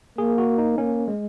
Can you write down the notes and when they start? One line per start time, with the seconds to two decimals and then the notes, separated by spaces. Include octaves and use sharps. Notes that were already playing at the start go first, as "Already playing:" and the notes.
0.18 A#3 G#4
0.38 F#4
0.58 D#4
0.78 A#3 C#4
1.08 G#3